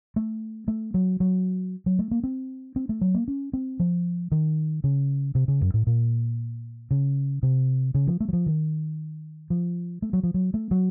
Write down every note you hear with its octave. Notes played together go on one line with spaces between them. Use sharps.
A3
A3
F#3
F#3
F#3
A3
A#3
C4
C4
A3
F#3
A#3
C#4
C4
F3
D#3
C#3
C3
C#3
F#2
A2
A#2
C#3
C3
C#3
F3
A3
F#3
F3
D#3
F3
A3
F#3
F3
F#3
A3
F#3